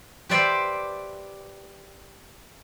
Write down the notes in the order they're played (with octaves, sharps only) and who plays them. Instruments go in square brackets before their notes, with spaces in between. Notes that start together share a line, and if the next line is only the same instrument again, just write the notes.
[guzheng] G4 B4 C5 D5 E5 G5